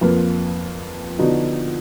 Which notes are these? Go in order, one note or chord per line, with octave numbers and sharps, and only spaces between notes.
F2 F3 A#3 F4 B4
D3 F3 B3 D#4 F#4